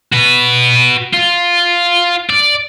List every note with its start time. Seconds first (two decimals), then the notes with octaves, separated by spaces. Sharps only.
0.13 F#4 B4
1.14 F4
2.30 D5